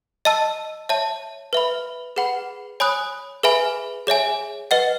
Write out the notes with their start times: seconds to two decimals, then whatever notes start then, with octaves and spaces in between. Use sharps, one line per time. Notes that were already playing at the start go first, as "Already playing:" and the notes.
0.25 D#5 A5 E6
0.89 C#5 E5 A5
1.53 B4 E5 B5
2.16 G#4 B4 F#5 B5
2.80 C#5 G#5 B5 D#6 F#6
3.43 G#4 B4 E5 G#5 B5
4.07 G#4 C#5 E5 G#5
4.71 B4 D#5 F#5